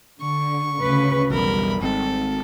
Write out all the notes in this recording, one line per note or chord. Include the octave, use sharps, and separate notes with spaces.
D3 C#6
D2 C#3 B4
B1 E2 G3 A#4 B5
G#1 G#2 C4 A4